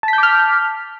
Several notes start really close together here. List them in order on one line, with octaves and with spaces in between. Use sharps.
A5 B6 G6 D6 F6